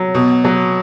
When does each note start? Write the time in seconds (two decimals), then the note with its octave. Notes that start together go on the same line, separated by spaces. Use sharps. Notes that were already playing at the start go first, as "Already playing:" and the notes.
Already playing: F#3
0.14 B2
0.45 F#3